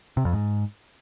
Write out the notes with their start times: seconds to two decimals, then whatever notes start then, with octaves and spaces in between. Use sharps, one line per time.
0.17 C3
0.25 F2
0.33 G#2